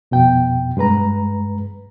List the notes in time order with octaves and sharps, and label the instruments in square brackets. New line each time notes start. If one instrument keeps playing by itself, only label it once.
[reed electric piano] F2 B2 G5
G2 G#3 B4 A#5